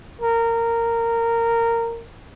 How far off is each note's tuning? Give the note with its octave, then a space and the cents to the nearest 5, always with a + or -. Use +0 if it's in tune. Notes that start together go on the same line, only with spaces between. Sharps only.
A#4 -15